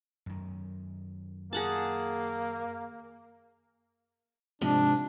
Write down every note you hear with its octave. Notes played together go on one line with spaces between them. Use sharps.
F#2 D#3
A#3 G#4 F#5 A5
G#2 C3 F3 D4